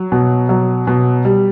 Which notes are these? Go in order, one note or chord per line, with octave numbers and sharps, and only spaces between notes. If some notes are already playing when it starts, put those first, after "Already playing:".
Already playing: F#3
B2
F#3
B2
G3